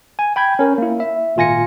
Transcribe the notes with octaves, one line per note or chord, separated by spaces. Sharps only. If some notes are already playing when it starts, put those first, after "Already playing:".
G#5
G5 B5 G6 G#6
C#4 A#4
A#3 E4
E5
G#1 A#2 F4 G#5 A#6 C#7